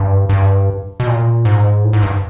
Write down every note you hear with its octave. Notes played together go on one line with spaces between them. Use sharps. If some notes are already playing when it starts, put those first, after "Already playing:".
Already playing: G2
G2
B2
A#2
G#2
A2
G#2
G2